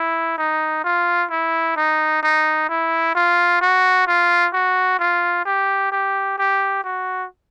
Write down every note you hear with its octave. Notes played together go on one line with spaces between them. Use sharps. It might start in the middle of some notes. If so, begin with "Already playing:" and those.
Already playing: E4
D#4
F4
E4
D#4
D#4
E4
F4
F#4
F4
F#4
F4
G4
G4
G4
F#4